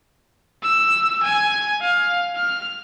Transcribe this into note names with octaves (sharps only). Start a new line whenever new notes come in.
E6
G#5
F5
F6